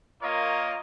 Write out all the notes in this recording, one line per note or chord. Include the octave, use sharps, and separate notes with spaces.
A#3 F4 A#4 C#5 D#5 A#5